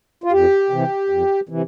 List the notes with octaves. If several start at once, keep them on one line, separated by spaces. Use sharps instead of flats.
F4
F2 G4
C3 E3
F2
C3 E3